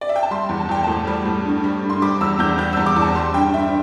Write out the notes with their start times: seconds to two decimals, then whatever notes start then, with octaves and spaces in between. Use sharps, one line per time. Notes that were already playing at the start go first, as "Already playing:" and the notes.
0.01 D5
0.09 E5
0.16 G5
0.23 A5
0.31 G3 C6
0.49 E2
0.60 A5
0.69 E2 G5
0.84 A2 A5
1.07 G3
1.25 A2
1.45 G2
1.64 G3
1.83 G2
1.90 C6
2.02 G3 D6
2.21 E2 E6
2.39 E2 G6
2.58 G3 G6
2.73 E2 E6
2.86 D6
2.96 E2
3.02 A5
3.15 G3 C6
3.34 G2 G5
3.53 G2 E5